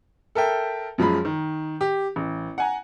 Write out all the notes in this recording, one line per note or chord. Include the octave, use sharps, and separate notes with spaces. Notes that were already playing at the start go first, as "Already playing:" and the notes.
A4 A#4 E5 G5
F#2 F3 G#3 B5
D#3
G4
A1
F#5 G#5 A#5